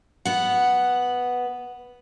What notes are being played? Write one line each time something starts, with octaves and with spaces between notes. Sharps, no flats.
B3 F#5